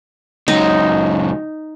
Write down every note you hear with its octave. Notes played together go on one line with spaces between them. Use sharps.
C#2 F#3 D#4